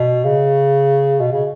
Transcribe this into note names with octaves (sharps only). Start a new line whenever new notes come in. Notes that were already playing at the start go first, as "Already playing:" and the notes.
Already playing: B2
C#3
B2
C#3